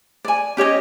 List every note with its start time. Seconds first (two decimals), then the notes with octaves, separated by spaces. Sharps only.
0.25 D5 G#5
0.57 C#4 G4 C#5 D#5